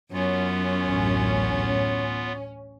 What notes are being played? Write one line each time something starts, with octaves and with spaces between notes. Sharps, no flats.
F#2 B3 C#4 F4
A1 D2